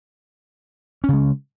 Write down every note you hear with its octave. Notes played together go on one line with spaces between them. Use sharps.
C#3 G#3 C#4